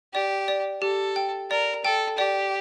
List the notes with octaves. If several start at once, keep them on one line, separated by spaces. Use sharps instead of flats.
G4 D5
D5
G4 A4
G5
A#4 D5
A4 G5
G4 D5